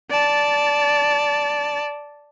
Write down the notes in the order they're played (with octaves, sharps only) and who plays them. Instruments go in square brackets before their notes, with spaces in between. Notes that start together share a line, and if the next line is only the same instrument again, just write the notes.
[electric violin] D5 A5